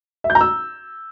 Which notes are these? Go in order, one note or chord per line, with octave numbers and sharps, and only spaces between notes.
E5
G6
A#5
E6